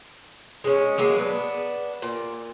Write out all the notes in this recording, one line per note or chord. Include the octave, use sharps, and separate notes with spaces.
G#3 C#4
F#3 G#3 A#3
B3 D4
A#2